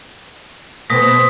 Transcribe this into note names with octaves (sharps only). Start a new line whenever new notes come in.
B2 B3 C4 D#6 A#6 B6